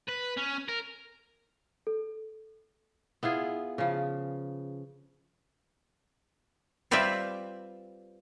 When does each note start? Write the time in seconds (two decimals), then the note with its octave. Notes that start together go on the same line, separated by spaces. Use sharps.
0.09 B4
0.37 C#4
0.68 A#4
1.87 A4
3.23 B3 E4 F4 G#4
3.78 C#3 F3
6.91 G3 C4 F4 B4 D5 E5